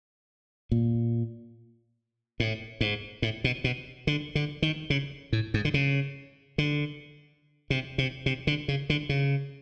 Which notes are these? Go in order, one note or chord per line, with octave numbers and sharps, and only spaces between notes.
A#2
A2
G#2
A2
B2
B2
D3
D3
D#3
C#3
A2
G#2
D3
C#3
D3
C3
C3
C3
D3
C#3
D3
C#3